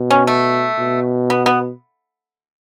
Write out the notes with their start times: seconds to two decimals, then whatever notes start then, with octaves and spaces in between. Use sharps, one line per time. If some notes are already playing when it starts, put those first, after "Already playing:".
Already playing: B2
0.11 C#4
0.27 A3
0.78 B2
1.30 B3
1.46 B3